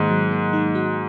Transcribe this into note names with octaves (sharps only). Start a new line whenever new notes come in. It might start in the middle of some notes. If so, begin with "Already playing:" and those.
Already playing: G#2 D#3 G#3 A#3
F#3
A#3
D#4
F#4